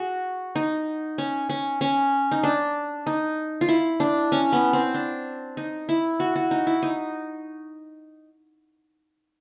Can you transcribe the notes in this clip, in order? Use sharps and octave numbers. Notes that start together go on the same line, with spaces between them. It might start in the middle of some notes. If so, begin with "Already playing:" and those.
Already playing: F#4 G#4
D#4
C#4
C#4
C#4
D#4
D4
D#4
F4
E4
D4
C#4
B3
C4
D4
D#4
E4
F#4
F#4
D#4
E4
D#4